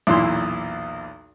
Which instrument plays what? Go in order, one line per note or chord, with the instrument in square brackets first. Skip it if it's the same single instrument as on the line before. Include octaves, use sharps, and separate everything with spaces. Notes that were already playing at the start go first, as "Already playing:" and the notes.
[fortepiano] B1 E2 A#2 E4 C6